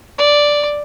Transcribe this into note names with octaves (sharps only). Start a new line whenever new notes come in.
D5